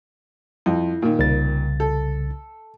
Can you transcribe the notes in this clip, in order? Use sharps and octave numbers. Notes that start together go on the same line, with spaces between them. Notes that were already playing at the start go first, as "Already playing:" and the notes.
F2 E4
A#2 D#3
C2 C#3 A6
A4